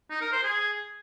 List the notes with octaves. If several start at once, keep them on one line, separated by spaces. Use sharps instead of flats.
D#4
A#4
C5
G#4